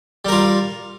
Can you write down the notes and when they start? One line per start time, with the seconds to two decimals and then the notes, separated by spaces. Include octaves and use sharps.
0.25 G3
0.28 A#4
0.32 F4